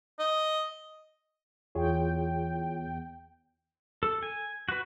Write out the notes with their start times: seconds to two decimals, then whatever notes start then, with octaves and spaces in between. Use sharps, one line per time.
0.19 D#5
1.75 E2 F4 G#4 C#5 G5
4.03 A4
4.23 G#5
4.69 F#4 B4